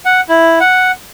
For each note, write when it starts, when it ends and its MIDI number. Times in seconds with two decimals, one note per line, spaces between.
0.05 0.21 78
0.29 0.59 64
0.60 0.91 78